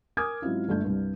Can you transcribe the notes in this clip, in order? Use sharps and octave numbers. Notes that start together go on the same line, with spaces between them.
A#4 G#5 D6 D#6 F6 G#6
G#2 F#3 C4 C#4 E4 F4
G1 A3 G6
C2 G2